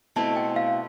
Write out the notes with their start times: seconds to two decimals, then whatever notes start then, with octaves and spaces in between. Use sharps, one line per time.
0.16 B2 A3 C4 E4 A5
0.36 G5
0.56 F5